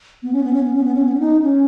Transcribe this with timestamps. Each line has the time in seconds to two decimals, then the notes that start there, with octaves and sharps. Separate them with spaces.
0.23 B3
0.33 C#4
0.44 B3
0.53 C#4
0.64 B3
0.73 C#4
0.84 B3
0.95 C#4
1.04 B3
1.14 C#4
1.19 D#4
1.43 C#4